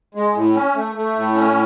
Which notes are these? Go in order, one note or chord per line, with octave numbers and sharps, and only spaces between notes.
G#3
A2
C#4
A3
A3
A2
C#4